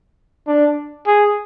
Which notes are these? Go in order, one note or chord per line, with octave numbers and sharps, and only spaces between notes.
D4
G#4